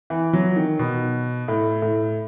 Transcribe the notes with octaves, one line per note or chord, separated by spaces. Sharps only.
E3
F#3
D#3
B2
A2
A2